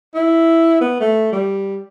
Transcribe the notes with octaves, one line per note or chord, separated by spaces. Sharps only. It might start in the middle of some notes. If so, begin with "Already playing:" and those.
E4
B3
A3
G3